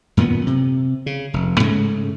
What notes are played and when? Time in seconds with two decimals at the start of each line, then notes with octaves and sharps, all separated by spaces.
0.17 F#2 A#2 D#3 B3
0.47 C3
1.06 C#3
1.34 F1
1.60 G#2 C#3 G#3 A3